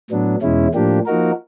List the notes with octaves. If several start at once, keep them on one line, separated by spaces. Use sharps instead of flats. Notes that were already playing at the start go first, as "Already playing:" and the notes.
A2 F#3 B3 D4
E2 B2 G#3 C#4 E4
A2 F3 A#3 D4 G4
F3 A#3 D#4 F#4 A#4